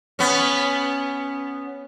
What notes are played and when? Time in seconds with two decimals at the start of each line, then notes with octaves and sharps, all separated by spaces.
0.19 B3 C#4